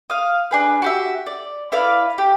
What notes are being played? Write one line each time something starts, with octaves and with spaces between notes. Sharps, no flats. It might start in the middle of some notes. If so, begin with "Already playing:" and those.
F5 D#6
D4 G#4 B4
F#4 G4 E5
D5
E4 B4 D5 F5
G4